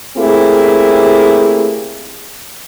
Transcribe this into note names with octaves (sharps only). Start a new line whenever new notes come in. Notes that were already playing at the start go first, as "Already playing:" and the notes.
A3 A#3 C4 E4 G4 G#4